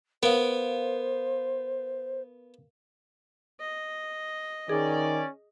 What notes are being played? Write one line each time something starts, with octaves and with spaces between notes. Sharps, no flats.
B3 A#4 C5 F5
D#5
D#3 C#4 G#4 D5